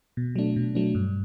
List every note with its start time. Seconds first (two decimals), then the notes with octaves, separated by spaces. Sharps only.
0.17 B2
0.36 F#3 A3 D4
0.56 B2
0.75 F#3 A3 D4
0.95 G2